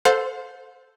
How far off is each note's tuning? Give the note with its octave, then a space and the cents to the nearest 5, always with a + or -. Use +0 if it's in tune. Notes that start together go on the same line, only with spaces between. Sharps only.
A4 +0 C5 -5 F5 +45